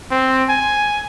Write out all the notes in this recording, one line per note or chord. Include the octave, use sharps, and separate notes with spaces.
C4
G#5